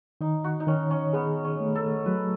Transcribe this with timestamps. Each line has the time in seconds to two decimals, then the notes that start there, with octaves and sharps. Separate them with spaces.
0.21 D#3 D#4
0.44 F#4
0.60 D#4
0.67 D#3 C#4
0.91 C#4
1.13 B3 G#4
1.44 C#4
1.60 A3
1.75 A4
2.06 F#3 B4